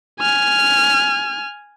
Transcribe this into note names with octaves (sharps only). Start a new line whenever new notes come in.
G#5 F6